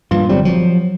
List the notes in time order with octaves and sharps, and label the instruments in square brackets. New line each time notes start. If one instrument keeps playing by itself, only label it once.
[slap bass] G2 E3 [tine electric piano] A#2 F4
[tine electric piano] G1 G3 C4 [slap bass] F#3
[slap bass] F3 [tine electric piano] F#3